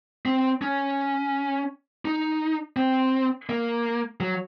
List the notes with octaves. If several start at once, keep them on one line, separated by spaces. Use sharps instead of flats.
C4
C#4
D#4
C4
A#3
F#3